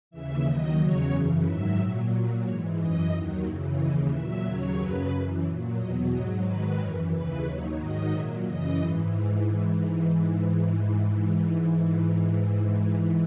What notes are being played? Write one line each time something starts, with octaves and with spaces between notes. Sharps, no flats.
D#2 C#3 E3 E5
D#2 D#3 F#3 D#5
E2 C#3 F#3 C#5
F#2 C#3 E3
G#2 D#3 F#3 E5
A#2 F#3
A#2 F#3
G#2 E3 C#5
F#2 E3 D#5
D#2 D#3 F#3
F#2 C#3 E3
D#2 C#3 E3 D#5
A#2 F#3 E5
D#2 C#3 F#3 C#5
F#2 C#3 F#3 B4
F#2 E3
A#2 F#3
E2 B2 F#3 D#5
G#2 F#3 D#5
G#2 D#3 F#3 B4
F#2 E3 A#4
D#2 C#3 E3 B4
D#2 D#3 F#3 C#5
G#2 D#3 F#3 D#5
A#2 F#3 E5
F#2 C#3 E3 D#5
G#2 E3
G#2 E3